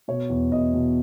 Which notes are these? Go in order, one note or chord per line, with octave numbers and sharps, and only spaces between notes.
B2 C#5
E2
E2 D#5
B2